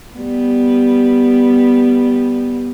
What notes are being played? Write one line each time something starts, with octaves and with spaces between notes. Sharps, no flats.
G3 B3